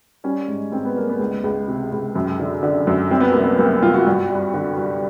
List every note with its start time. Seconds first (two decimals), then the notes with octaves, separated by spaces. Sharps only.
0.24 G3 C#4
0.48 G#2
0.72 G#2 C4
0.85 B3
0.96 G3 A#3
1.09 B3
1.19 C#2
1.44 C#2
1.68 C3
1.92 C#2
2.15 F#2
2.40 D3
2.63 D3
2.87 F#2
3.11 C2 C4
3.20 B3
3.32 C2 A#3
3.41 B3
3.58 C2 A#3
3.82 C2 F4
3.94 F#4
4.07 G2
4.30 G3
4.54 D3
4.78 G3